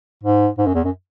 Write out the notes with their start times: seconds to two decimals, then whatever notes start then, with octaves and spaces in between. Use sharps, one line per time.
0.23 G#2
0.58 G#2
0.67 F#2
0.75 E2
0.84 F#2